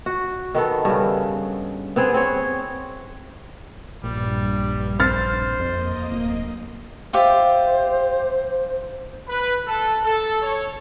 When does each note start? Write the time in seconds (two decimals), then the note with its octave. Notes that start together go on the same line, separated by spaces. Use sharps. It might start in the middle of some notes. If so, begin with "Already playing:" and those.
0.06 F#4
0.55 D#3 B3 A4
0.85 G2 C#3
1.96 B3 C4 G#4
2.14 C4 C#5
4.04 A#1 G2 G3
5.00 C5 F6 A6
5.60 F2 A#3 D#5
6.11 D1
7.13 F4 G4 C5 E5
9.28 B4
9.67 A4
10.03 A4
10.42 C#5